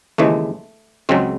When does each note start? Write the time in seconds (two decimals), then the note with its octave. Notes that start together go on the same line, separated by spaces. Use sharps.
0.18 D#2 C#3 E3 G#3 A3
1.09 C#2 C#3 F#3 G#3 C4